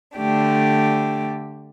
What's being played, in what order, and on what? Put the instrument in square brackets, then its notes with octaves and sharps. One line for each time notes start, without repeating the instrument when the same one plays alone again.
[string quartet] D3 A3 D4 G4